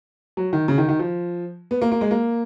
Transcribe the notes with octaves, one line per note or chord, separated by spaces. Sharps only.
F#3
D#3
C#3
D#3
D#3
F3
B3
A#3
A#3
G#3
A#3